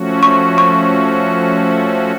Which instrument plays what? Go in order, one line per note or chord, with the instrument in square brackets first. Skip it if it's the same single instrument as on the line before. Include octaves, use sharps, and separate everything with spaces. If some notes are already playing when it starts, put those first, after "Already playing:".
Already playing: [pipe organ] F3 A3 C#4 F#4
[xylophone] C#6
C#6